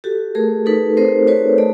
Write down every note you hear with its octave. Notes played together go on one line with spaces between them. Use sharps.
F#4 G4 A4
A3 G#4 A#4
D#4 A4 B4
C4 A#4 C5
F#4 B4 C#5
A3 D5